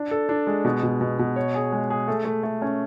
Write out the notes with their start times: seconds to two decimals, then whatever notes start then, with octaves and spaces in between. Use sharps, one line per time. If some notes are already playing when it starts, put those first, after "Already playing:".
Already playing: D4
0.11 A4
0.29 D4
0.47 G#3
0.65 B2
0.83 B2
1.01 B2
1.19 B2
1.36 C#5
1.55 G#4
1.72 G#3
1.90 G#4
2.08 A3
2.25 A3
2.43 A3
2.62 C#4